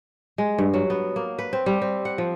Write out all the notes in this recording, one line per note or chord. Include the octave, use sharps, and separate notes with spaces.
G#3
G2
F#3
B3
A#3
B4
C4
G3
C4
F#5
F3